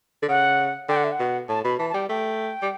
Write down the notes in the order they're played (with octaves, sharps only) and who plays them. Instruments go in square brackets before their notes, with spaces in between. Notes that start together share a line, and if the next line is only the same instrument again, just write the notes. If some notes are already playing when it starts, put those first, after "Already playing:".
[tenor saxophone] D3
[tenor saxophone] C#3 [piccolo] F#5
[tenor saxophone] D3 [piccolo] G5
[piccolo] F#5
E5
F#5
[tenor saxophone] B2
[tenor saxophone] A2 [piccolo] A5
[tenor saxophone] B2 [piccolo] B5
[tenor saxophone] E3 [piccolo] A5
[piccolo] A5
[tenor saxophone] G3 [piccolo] G5
[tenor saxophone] A3 [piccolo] G5
[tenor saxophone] G3